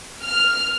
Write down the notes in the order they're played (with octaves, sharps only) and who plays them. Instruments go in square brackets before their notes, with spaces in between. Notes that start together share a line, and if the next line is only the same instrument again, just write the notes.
[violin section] F6